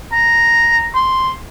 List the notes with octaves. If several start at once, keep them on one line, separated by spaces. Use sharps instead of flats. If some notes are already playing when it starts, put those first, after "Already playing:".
A#5
C6